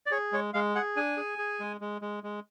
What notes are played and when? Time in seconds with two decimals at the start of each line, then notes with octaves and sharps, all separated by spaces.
0.06 D5
0.11 G#4 C#5
0.32 G#3 C#5
0.54 G#3 F5
0.75 G#4 F#5
0.96 D4 G#5
1.17 G#4
1.38 G#4
1.60 G#3
1.81 G#3
2.02 G#3
2.23 G#3